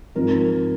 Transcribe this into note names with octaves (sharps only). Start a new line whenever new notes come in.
G#2 F3 C4 D#4 A#4